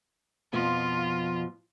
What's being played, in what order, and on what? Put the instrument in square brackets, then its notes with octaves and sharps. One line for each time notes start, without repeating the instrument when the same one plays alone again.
[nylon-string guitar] F2 B2 F3 [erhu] F4